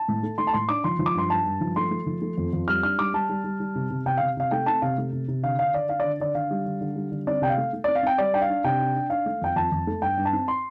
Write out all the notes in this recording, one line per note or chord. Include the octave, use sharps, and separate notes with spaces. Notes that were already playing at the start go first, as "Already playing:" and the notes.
Already playing: A5
A2
A3
A3 C6
A5
A2 C6
D4 D6
F3 C6
F3
D6
G2 C6
G2 A5
G2
F3
A3 C6
A3
F3
A3
F2
F2
G3 F6
D4 F6
G3 D6
G3 A5
G3
G3
G3
C3
C3
C3 G5
C3 F5
C3 F5
A3 G5
C4 A5
C3 F5
A3
C3
C3
D3 F5
D4 F5
D3 D5
D4 F5
D3 D5
D3 D5
D3 F5
G3
D3
D3
G3
D3
C4 D5
C3 G5
F5
A3
A3
C4 D5
F5
C4 G5
G3 D5
D4 G5
F5
D4
C3 G5
D4
D4
D4 F5
A3
F2 G5
F2 A5
F2
A3
G2 G5
G2
A5
C4
C6